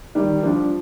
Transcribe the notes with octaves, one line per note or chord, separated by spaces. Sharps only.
D#3 G3
F3 G3 D4